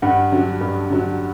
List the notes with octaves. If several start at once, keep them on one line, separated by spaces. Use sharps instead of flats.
G2 F#5
D3 F#3
G2
D3 F#3